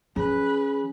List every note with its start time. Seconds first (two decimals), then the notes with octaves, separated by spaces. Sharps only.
0.16 F3 C#4 G#4 B4